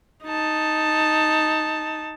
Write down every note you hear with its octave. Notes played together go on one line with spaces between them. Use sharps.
D#4 A5